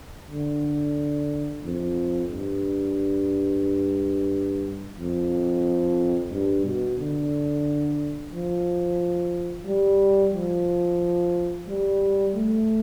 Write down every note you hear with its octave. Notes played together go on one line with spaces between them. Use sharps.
D3
F2
G2
F2
G2
B2
D3
F3
G3
F3
G3
A3